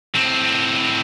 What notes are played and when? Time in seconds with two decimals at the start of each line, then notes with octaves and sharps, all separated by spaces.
0.15 A2 C4